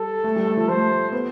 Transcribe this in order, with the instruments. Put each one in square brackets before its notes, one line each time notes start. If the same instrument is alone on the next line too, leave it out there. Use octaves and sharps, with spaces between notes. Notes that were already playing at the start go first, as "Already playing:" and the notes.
Already playing: [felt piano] G3 [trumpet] A4
[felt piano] A3
G3
A3
F3
[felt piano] A3 [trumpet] C5
[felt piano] B3